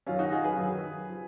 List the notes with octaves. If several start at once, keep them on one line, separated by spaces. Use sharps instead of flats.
F#2 D#3 F#3 C#4 F4
D#4 F#4
F4 G#4
G#4 B4
F#2 D#3 F#3
F3